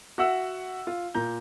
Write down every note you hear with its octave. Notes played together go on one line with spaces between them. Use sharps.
F#4 E5 F#5 E6
F4
A#2 A#5 G6